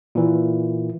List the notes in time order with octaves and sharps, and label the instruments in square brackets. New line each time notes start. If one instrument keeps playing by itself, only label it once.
[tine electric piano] A#2 E3